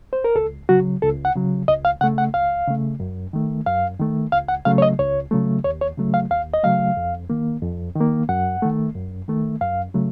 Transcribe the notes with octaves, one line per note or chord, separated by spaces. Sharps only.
C5
A#4
C#2 A4
C#3 F#3 F#4
C#2 A4
F#5
C#3 F#3
C#2 D#5
F5
C#3 A3 F#5
F#5
C#2 F5
C#3 A3
F#2
D#3 A3
F#2 F5
D#3 A3
C#2 F5
F#5
C#3 F#3 A3 F5
C#5
D#5
C#2 C#5
C#3 F#3 A3
D#2 C#5
C#5
C#3 F#3 A3
F5
D#2 F5
D#5
C#3 F#3 A3 F5
F2
D#3 A#3
F2
D#3 A#3
F#2 F#5
D#3 A3
F#2
D#3 A3
F#2 F5
C#3 F#3 A3